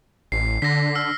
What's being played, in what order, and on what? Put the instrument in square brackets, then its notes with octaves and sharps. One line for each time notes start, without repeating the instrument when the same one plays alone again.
[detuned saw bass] A1 [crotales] C7
[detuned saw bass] D3 [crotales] A#6 B6
[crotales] E6 F6 C7